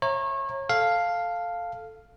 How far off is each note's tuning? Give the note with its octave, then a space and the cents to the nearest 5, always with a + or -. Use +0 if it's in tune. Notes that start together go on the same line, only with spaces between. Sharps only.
C#5 -30 E5 +0 A#5 -5
A4 +0 F5 +0